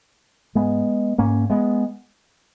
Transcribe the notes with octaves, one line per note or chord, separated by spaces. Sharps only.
G#2 G#3 B3
G#2 A#3 C#4
G#3 B3